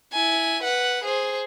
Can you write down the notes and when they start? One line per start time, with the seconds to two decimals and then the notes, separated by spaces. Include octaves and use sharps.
0.13 E4 G#5
0.63 B4 F#5
1.04 G#4 C5